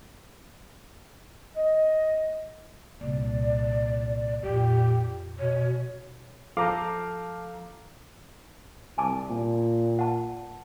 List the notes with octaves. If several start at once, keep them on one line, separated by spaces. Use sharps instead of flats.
D#5
C2 A#2 D5
F2 A#2 G4
B2 C#5
F3 A4 F5 A#5 D6 G6
C2 G#5 A5 D6
A#2
F#5 A5